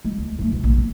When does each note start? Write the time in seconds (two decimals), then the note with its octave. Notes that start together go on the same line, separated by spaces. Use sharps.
0.05 G#3
0.18 D2
0.39 G#2 A3
0.52 B2 F3
0.64 A#1
0.78 B3